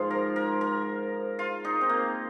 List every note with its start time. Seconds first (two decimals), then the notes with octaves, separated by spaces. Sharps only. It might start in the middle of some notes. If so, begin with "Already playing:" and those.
Already playing: G#2 F3 F4
0.11 A#4
0.36 A#4
0.61 A#4
1.39 F4
1.65 D#4
1.81 C4
1.89 A#3